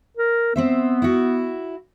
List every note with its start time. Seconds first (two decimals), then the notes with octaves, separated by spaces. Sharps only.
0.17 A#4
0.56 B3 C4 C5 E5
1.02 E4 F#4